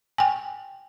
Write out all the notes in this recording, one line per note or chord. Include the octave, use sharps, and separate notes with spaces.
G5 G#5